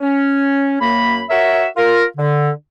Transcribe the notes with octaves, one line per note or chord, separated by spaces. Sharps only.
C#4
F#2 A#3 B5
F#4 A#4 C#5 E5
F4 A#4
D3